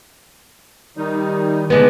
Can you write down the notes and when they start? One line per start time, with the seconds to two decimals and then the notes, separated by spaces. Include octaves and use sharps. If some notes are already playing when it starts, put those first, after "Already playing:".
0.97 D#3 G3 D#4
1.70 D3 G#3 B3